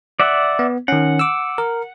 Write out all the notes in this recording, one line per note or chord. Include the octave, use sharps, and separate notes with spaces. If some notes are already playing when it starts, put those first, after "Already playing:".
D5 E5 F#5
B3
D#3 C#4 F#5
D6 E6
A#4